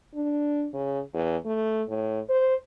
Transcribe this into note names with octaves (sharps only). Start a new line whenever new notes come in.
D4
C#3
E2
A3
A2
C5